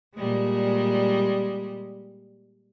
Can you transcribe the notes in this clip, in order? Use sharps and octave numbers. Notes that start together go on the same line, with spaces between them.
A#2 G3 G#3